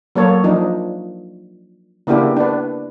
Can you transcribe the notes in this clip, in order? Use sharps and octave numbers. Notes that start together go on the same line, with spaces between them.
F#3 A#3 A4 C#5
F3 D4 D#4
C#3 A#3 B3 D4 E4 G4
D4 B4